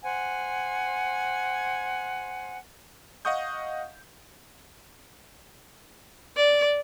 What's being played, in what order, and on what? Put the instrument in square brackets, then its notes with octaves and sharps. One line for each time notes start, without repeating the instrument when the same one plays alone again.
[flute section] C5 F#5 G#5
[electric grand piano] D#5 F5 F#5 C#6 D#6 G6
[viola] D5